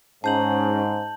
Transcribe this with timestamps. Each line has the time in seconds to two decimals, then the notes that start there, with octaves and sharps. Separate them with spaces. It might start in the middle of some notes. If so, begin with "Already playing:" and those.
0.24 G#2 C#4 C5 A5 A#5 G6 F#7